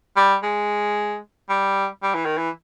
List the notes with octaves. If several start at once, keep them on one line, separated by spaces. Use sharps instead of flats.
G3
G#3
G3
G3
E3
D#3
E3